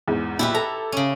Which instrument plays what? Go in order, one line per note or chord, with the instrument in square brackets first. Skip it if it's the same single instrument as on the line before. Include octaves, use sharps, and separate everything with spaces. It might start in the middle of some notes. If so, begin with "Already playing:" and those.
[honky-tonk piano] E2 G#2
[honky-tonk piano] B1 A#2 [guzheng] E4 G4 B4
[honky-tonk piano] A4 [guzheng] A#5
[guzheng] C#3 C#4